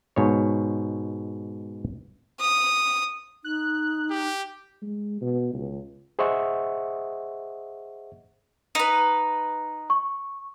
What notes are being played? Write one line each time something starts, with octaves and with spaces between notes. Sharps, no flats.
G#2 B2 C#5
D#6
D#4 F#6
G4
G#3
B2
C#2
G#4 C5 D#5 E5 F#5 C#6
D#4 B4
C#6